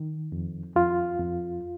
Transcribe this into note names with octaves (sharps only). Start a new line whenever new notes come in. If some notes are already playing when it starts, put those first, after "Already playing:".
Already playing: D#3
F2
F2 F4
F2